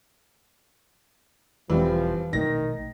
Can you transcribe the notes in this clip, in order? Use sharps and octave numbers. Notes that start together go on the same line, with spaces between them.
E1 E3 F3 G3 C4
A#1 B2 D#3 A3 A#6